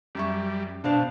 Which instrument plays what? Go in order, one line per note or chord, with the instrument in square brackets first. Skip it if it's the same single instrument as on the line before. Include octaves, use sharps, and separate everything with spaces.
[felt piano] F#2 E5 C#6 [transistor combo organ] G3
[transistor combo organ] B2 [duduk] D4 [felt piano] C5 F5 A5